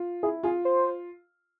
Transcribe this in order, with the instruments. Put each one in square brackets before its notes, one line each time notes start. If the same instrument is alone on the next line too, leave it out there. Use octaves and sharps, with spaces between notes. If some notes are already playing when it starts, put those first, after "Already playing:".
Already playing: [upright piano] F4
[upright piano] E4 [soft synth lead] G#4
[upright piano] F4 [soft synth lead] G#4
[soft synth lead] C5